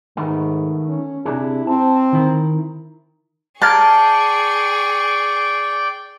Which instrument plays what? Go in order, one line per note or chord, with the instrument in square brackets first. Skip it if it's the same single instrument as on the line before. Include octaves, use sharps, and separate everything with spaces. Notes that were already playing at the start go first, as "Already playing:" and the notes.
[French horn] G#2 [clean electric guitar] D#3 A3 B3
[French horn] C#4
[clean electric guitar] C3 D4 G#4 [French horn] E4
[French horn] C4 [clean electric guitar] A5
[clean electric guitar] D#3 E4 A#4
[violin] G#4 C#6 [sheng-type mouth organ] D5 G5 [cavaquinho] A5 [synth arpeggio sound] A#5 F6 G#6